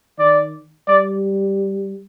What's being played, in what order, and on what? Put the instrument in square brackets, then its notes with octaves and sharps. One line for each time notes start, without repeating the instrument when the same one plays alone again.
[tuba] D#3 [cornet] D5
[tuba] G3 [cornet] D5